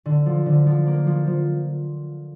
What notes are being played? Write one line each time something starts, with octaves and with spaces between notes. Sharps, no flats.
D3
F3
D3
F3
A#3
F3
F3